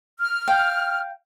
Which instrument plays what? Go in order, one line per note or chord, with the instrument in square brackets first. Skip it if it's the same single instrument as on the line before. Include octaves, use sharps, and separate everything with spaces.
[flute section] F6
[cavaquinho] F5 G5